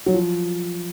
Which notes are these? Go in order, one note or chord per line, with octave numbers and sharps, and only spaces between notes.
F#3
F3